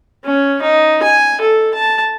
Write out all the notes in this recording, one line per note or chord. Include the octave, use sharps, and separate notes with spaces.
C#4
D#4
G#5
A4
A5